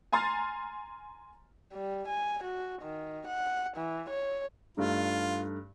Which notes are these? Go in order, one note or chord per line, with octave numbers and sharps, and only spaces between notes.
G#5 A#5 C6 F6 A6
G3
G#5
F#4
D#3
F#5
E3
C#5
G2 A3 D#4 F4